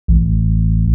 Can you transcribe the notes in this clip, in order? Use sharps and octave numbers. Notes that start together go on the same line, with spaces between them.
A1